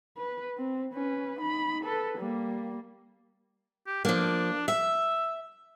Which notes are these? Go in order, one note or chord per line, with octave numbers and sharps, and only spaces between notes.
B4
C4
C#4 B4
D#4 B5
A4 B4
G3 A#3
G4
F3 A#3 D4
E5 E6